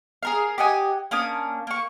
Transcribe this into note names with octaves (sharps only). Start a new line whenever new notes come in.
G#4 A#4 F5
G4 D#5 F#5 G#5
A#3 C#4 D4 D#6
A#3 C#6